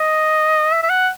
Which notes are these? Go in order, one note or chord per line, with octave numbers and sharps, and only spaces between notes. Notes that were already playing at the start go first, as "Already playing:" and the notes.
Already playing: D#5
E5
E5
F#5